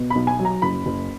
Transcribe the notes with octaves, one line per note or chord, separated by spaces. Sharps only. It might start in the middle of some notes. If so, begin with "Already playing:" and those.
Already playing: B2
B1 B5
G#5
F#3
A#5
F#1 B5
F#1